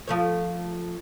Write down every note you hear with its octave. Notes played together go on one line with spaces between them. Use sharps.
F3 A3 C#5